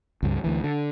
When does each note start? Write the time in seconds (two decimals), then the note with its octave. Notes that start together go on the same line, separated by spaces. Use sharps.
0.23 C#2 G2
0.44 D2 E3
0.64 D3